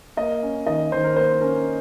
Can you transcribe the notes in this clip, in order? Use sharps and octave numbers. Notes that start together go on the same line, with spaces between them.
A#3 D#5
C#4
D#3 D#5
D#3 C5
A#4
A#3 C5
C#4 A#4